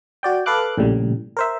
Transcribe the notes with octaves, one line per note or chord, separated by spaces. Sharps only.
F#4 D5 G5
A4 B4 F5 D6 F#6
A#1 A2 C#3 G3
A#4 C5 E5